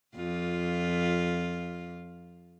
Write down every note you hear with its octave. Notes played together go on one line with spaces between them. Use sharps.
F2 F4